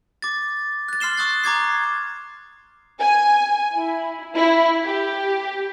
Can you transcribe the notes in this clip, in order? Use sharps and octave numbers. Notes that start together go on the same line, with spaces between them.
D6 A6
F#6 A6
C6 F6 C7 E7 G7
C#6 D#6 F#6 A6
A#5 D6 G#6 C7
G#5
E4
E4
G4